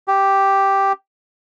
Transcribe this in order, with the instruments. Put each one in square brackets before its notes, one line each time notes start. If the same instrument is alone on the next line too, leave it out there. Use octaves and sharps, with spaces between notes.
[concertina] G4